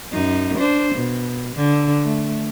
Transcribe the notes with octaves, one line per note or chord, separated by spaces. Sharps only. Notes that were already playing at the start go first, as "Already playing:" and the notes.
F#2 D#4
D4 C5
B2
D3
A3